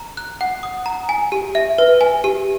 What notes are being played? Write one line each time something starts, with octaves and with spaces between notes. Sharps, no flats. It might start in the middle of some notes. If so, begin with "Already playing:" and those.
Already playing: A#5
F#6
F#5
D#6
A#5
G#5
G4
E5
B4
G#5
G4